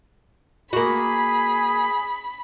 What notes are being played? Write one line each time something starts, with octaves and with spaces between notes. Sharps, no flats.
A#3 F#4 G#4 B5